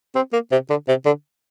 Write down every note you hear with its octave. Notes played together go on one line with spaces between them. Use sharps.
C4
A#3
C3
D3
C3
D3